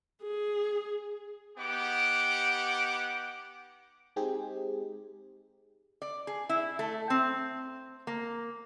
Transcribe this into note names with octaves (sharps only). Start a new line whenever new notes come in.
G#4
B3 D#4 G4 F#5 D6
G#3 C4 D#4 G4 G#4
D5
G#4
E4
A3
C4
A#3